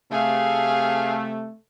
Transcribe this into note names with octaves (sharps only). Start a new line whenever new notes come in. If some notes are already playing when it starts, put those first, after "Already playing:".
C3 A3 G#4 F5